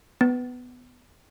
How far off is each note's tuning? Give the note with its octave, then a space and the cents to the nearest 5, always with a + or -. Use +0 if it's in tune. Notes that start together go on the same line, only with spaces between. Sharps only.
B3 +10